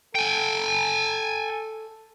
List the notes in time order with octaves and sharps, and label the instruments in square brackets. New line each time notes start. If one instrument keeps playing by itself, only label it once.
[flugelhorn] A4 [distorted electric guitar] G5 G#5